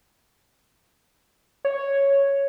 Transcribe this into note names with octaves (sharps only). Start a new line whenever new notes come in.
C#5